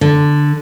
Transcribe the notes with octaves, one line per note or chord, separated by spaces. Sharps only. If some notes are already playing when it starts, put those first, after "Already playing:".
D3